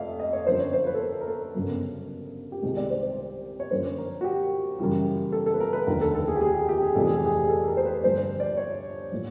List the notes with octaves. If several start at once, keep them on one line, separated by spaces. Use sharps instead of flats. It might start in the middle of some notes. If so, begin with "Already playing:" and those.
Already playing: F1 F2 E5 F5
D#5
C#5
F#2 D3 F3 A#3 C5
C#5
C5
B4
A4
A#4
A#4
A4
G1 F#2 C#3 F#3 B3
G4
C2 C3 D#3 G#3 G#4
D5
C5
C5
C#5
F#2 D3 F3 A#3 C5
A#4
F#4
G4
F#2 C#3 E3 G3
A4
A4
B4
A#4
B4
F1 D#2 D3 F3 A#4
A4
A4
G#4
G4
G#4
G4
G4
G#4
F1 F2 C3 E3 A4
G#4
G4
G#4
G#4
A4
A#4
C5
B4
G2 D3 F3 A3 C5
D5
C#5
A2 F3 A#3